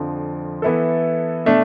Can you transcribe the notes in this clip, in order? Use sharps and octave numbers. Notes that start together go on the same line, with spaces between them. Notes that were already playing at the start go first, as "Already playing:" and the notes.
Already playing: F2 D3 F3
E3 B3 E4 A4
B2 A3 D4